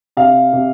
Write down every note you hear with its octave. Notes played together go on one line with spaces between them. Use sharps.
C3 F5
C3